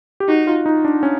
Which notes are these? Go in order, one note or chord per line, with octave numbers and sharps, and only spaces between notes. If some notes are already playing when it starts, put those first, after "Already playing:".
G4
D#4 F#4
F4
D#4
D4
C#4